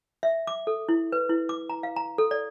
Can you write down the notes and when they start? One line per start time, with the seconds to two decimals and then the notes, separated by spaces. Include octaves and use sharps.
0.23 E5
0.47 D6
0.67 A4
0.89 E4
1.12 B4
1.29 E4
1.49 D6
1.70 A#5
1.83 F5
1.96 A#5
2.18 A4
2.31 D5